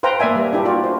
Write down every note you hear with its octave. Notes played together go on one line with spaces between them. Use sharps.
B4 C5 F5 G5 A#5
A#3 B4 D5 E5 G#5
G3
D4 E4 G4
F4 F#4 D5
C5